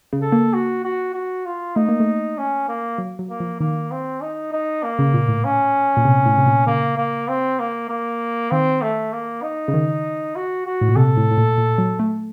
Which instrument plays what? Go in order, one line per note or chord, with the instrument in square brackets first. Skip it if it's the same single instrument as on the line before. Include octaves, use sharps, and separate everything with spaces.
[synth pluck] C#3
[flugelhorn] A4
[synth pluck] A#3
[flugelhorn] F#4
F#4
F#4
F4
[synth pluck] A3 [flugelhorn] D#4
[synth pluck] A#3
A3
[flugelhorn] C#4
A#3
[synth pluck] F#3
F#3
[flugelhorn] A#3
[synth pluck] F3
[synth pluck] D#3 [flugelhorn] A#3
[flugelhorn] C4
D#4
D#4
A#3
[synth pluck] C#3
A#2
A2
[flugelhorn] C#4
[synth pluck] A#2
C3
A2
C3
A#2
[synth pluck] C#3 [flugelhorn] A#3
[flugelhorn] A#3
C4
A#3
A#3
[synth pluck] D#3 [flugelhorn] C4
[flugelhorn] A3
A#3
D#4
[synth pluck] C#3
D#3
[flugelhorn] F#4
F#4
[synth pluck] A2
A#2
[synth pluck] C3 [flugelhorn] A4
[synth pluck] A2
A2
A#2
A#2
F#3
A3